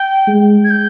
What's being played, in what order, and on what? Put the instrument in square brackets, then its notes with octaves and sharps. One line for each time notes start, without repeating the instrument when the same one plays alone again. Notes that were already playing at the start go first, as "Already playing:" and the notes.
Already playing: [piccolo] G5
[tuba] G#3
[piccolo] G#6
G6